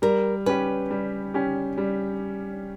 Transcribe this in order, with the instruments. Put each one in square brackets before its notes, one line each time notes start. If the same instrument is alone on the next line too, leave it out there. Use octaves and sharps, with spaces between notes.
[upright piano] G3 [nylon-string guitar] A#4
[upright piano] C#4 G4 [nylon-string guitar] B4
[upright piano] G3
C#4 G4
G3